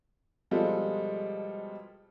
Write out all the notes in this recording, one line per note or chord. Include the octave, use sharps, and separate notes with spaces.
B2 F3 G3 G#3 F4 A4